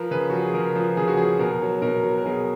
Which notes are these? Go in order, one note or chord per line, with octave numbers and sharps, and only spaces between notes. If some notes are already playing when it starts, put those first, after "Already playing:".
Already playing: F3 A#4 B4
C#3 B4
F3 F#4
G#4
C#3 A#4
F3
C#3 G#4
F#4
F3 G#4
B2 A#4
F#3
B2 A#4
F#3
A#4
B2 G#4